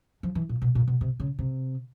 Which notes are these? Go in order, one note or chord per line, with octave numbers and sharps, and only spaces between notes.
F3
E3
A#2
B2
A#2
B2
C3
C#3
C3